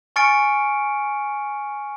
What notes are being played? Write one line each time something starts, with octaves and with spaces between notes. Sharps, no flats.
G#5 C#6 F6 A6 C#7 D7